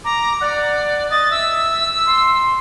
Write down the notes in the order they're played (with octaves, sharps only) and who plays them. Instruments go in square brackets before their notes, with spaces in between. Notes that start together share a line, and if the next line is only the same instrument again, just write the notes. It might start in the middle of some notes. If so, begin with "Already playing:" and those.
[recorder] A#5 [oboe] D6
[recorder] D5 [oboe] F#5
[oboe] D#5 [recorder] A6
[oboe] E5 [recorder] E6
[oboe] C6